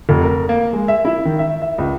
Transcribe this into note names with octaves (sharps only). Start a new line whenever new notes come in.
F1
A#4
A#3
G#3
E5
E4
D#3
E5
E5
C#2